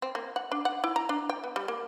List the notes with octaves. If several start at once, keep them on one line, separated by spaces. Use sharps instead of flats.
C4
A#3
F#5
D4
F#5
E4
A#5
D4
G5
B3
G3
A#3